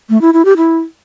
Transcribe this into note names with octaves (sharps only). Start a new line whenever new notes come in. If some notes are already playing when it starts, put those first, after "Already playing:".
A3
E4
E4
G4
E4